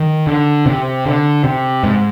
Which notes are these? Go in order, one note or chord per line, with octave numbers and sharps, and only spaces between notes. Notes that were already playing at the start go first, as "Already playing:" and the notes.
Already playing: D#3
D3
C3
D3
C3
G#2